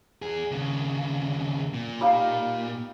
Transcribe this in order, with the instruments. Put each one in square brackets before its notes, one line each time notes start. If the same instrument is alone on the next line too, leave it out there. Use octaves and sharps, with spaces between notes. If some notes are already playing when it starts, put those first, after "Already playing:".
[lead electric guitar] E2 G#4
D#2 C#3
A#2
[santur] G3 D#4 F5